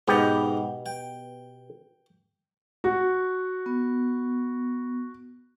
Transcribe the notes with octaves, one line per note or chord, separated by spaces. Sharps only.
G#2 B2 B3 D#4 G4
G5
F#4
B3